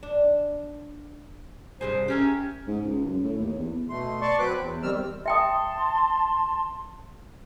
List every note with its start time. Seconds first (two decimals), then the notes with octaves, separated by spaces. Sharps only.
0.03 D4
1.81 G2 C3 G#4 C5
2.08 C#4 G4 A#4 E5
2.67 G#2
2.84 C#2
3.06 F#2
3.24 A2
3.39 D#2
3.58 E2
3.89 B2 A3 C6
4.21 D5 A5 C6 C#6
4.39 F#3 C4 B4 D6 F#6
4.58 E2
4.83 D#3 G3 C4 E6 F6
5.26 E5 G5 A5 C6 D#6